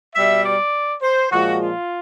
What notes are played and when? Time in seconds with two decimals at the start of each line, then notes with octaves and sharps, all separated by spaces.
0.15 B2 G3 E5
0.44 D5
1.02 C5
1.30 A#2 F3 G#3 F#4
1.60 F4